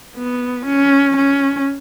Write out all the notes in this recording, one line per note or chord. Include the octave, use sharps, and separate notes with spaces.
B3
C#4
C#4